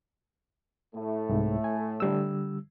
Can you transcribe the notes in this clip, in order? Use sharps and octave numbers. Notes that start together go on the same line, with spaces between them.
A2 A3
C2 G#2
G#5
D3 G3 E6